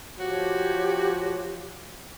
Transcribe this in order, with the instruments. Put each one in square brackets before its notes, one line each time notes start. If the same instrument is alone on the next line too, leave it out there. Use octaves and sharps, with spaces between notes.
[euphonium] F3 [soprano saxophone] F#4 [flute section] G4 C#5